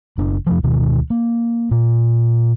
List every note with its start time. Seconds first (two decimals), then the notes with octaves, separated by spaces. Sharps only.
0.18 F#1 D4
0.47 F2 C3 F3
0.63 D2 B2 D#3
1.10 A#3
1.71 A#2